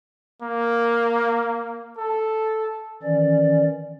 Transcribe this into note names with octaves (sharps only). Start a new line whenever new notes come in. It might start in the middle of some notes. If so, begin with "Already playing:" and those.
A#3
A4
D#3 E3 C#4 D5